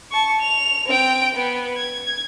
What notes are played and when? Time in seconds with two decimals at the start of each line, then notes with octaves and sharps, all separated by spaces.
0.12 A5 C#6
0.41 F7
0.86 C4 G5
1.34 B3
1.77 G#6